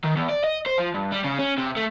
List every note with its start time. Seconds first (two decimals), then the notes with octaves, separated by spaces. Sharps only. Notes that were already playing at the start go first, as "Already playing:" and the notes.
0.04 D#3
0.16 E2
0.29 D5
0.44 D#5
0.66 C5
0.78 F3
0.95 G2
1.12 G3
1.24 C#3
1.39 C#4
1.58 C3
1.77 A3